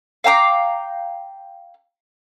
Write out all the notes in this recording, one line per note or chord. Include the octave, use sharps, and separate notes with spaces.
F5 G5 A#5 D6